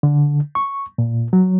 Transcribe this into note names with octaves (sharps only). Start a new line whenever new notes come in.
D3
C#6
A#2
F#3